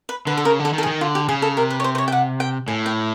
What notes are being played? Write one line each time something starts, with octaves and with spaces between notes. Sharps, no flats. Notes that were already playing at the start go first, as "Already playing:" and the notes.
B4
D3 B4
A4
C#3 A#4
D3
A4
D#3
A4
G#4
D#3
D3 F4
G4
C#3 G#4
A4
C3 A#4
B4
C#5
C5
C5
C#5
G5
F#5
G5
A2 G#5
G5